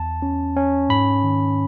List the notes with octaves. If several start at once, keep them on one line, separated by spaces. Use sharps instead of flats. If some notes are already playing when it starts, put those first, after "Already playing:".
Already playing: E2 A5
C#4
C#4
G#2 B5
D#3